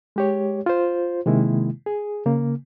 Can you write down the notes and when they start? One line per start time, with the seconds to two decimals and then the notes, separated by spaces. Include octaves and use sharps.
0.16 G#3 G4 C#5
0.66 F4 C5
1.26 C3 D#3 G#3 A#3 E4
1.86 G#4
2.26 C#3 A#3